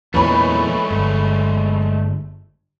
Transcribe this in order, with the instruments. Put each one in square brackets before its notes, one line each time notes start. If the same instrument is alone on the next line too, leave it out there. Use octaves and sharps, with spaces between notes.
[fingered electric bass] E2 A#2 [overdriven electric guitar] G#3 A3 [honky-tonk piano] B4 C#5 B5
[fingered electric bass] G1